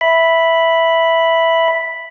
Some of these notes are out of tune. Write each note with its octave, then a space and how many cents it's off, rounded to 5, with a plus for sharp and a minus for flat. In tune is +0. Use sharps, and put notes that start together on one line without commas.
E5 +0 B5 +0